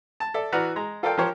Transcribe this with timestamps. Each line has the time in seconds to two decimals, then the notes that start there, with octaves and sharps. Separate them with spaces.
0.20 A5
0.34 A4 D5 E5
0.52 E3 F#4 B4 D5 A#5 F6
0.76 G#3 A#5
1.03 F4 A4 A#4 D5 F5 G5
1.17 F3 G4 A#4 C5 C#5